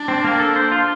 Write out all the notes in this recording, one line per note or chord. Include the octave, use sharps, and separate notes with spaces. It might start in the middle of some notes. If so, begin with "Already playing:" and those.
Already playing: D4
C4
A#3
A4
C5
F4